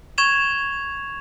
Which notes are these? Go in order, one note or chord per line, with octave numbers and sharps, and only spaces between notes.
C#6 G#6 E7 F7